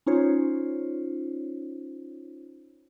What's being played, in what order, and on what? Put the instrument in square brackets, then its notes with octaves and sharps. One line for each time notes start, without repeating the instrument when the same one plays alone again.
[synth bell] C#4 D#4 F4 C5 C#5